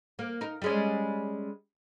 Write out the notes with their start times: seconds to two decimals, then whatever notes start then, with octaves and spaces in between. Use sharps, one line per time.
0.19 A#3
0.41 D#4 A#4
0.62 G3 G#3 C#4